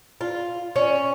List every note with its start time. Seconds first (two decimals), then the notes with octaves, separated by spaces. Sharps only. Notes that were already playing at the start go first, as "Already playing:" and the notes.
0.21 F4
0.76 C#4